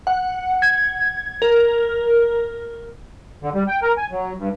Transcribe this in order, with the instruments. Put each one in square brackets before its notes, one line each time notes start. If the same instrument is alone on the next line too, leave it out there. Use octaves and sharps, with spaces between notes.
[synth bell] F#5
G#6
A#4
[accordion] D3
G3
G5
A#4
G#5
F#3
G2